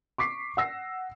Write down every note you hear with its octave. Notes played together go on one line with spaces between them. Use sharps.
C#6 D6 B6 C7
F#5 E6 A#6 C7